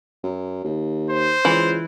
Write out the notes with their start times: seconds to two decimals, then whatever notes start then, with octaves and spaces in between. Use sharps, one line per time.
0.24 F#2
0.64 D#2
1.10 C5
1.45 C#2 E3